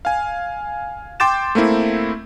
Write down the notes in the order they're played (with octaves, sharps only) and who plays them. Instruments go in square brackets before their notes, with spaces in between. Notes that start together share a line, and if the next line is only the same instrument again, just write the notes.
[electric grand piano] F5 G#5
G5 C6 D6 G6 A6 E7
A3 A#3 C4 E4